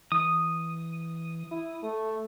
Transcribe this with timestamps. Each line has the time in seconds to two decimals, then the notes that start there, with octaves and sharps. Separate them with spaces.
0.12 E3 D#6
1.51 E4
1.83 A3